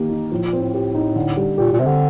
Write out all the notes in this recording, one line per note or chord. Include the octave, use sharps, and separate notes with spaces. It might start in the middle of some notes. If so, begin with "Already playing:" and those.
Already playing: D#3 A#3 G4
D#4
A2 F3
A#2
C4
A2
G4
D#4
D3
G3
A#2 G4
A#2
C3 C4
D3